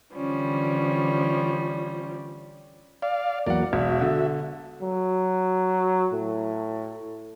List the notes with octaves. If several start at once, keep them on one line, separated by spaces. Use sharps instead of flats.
D3 E3 F3 G3 C#4
D5 F5
E2 F#3 A#3 D5 F#5
E1 F#4 E5
D3
F#3
A2